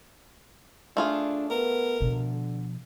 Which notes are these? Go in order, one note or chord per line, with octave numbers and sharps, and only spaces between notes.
A3 D4 F4 G#4
B3 A#4
B2 D3 F3